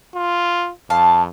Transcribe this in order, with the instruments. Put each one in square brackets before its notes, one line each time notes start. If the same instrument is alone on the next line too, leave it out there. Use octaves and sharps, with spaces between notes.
[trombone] F4
[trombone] F2 [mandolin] F5 A5